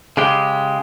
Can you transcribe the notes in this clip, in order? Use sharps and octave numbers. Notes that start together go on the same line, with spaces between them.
C#3 G#3 G4